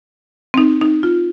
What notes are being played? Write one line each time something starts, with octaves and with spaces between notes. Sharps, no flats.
C4
D#4
D#4
F4